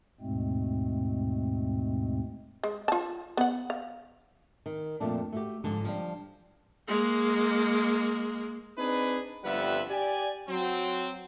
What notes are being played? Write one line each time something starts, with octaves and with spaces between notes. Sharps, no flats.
D#2 G#2 B2 G#3 A3 C4
G#3
F4 A5
B3 F#5
F5
D#3
F2 A#2 A3 D4
A3 F#4 G4
G#2 D3 F3
F3 G3 D4
G#3 A#3
C4 D4 D#4 G#4 B4
G1 F2 G3 B4 E5 F#5
G4 D5 G#5
F#3 C4